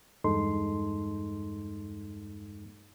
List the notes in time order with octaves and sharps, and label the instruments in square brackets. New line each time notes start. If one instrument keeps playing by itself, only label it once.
[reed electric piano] E2 G2 G#3 D#4 A4 C6